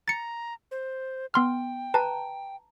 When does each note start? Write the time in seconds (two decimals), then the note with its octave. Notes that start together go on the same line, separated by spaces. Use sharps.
0.08 A#5 A6 C#7
0.71 C5
1.34 B3 G5 C6 F6
1.94 B4 A5 A#5